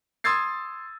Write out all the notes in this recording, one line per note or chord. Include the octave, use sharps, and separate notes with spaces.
C6 D#6 E6 G#6 A6 C7